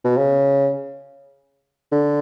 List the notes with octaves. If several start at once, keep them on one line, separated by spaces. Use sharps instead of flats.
B2
C#3
D3